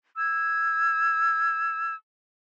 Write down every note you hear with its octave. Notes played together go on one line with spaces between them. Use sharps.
E6 G#6